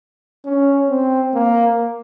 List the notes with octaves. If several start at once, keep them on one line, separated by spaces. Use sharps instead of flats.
C#4
C4
A#3